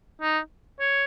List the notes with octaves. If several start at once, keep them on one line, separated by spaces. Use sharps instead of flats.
D#4
C#5